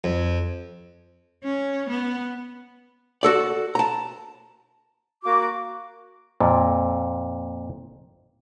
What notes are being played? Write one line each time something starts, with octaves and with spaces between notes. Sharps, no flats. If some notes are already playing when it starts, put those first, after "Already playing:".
F2
C#4
B3
F#4 A4 D5
A5 A#5
A#3 F#4 D6
F2 A#2